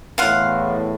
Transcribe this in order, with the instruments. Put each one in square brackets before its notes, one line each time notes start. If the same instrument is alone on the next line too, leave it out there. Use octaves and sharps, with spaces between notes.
[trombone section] E2 A2 [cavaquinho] F5 F#5 C6